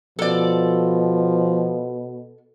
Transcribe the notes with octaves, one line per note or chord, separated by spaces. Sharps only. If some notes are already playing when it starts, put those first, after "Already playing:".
B2 F3 A4 D5